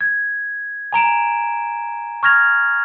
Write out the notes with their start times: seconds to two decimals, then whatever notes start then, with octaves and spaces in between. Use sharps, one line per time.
0.01 G#6
0.93 G#5 A#5 D7 E7
2.23 C#6 F6 G#6 A#6 F7